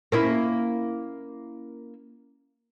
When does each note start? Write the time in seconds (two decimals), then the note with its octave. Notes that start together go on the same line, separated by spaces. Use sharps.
0.12 A#3 C#4 E4